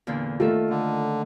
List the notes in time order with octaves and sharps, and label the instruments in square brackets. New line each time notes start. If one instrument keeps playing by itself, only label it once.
[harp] E2 A#2 D3
[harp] D#3 A3 E5 [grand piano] F4 A4
[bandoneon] D3